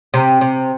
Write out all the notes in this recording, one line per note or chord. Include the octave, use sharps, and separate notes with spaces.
C3
C3